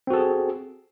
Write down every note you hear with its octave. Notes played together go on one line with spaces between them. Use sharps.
C4 F#4 G#4 A4